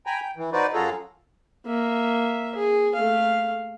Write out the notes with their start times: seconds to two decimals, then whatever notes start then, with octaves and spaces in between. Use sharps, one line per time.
0.06 G5 G#5 A#5 B5
0.22 G5
0.37 E3
0.53 D#4 F#4 B4 C5 D5
0.74 F#2 F4 F#4 G#4 A4 A#5
1.66 A#3 E5
2.55 G#4
2.95 A3 F5